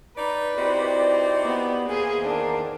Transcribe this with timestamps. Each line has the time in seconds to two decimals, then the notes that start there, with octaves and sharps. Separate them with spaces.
0.17 D#4 B4 D5
0.56 C4 D#4 E4 F#4 G4 D5
1.45 B3
1.89 E2 A#3 G#4 C5
2.22 D#3 D4 A#4